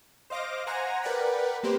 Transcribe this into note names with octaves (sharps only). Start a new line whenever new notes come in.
C5 D#5 F5 D6 A#6
C5 F#5 G#5 A#5 A#6
A#4 B4 D5 F#5 G5 B5
A#3 C4 G4 B4 C5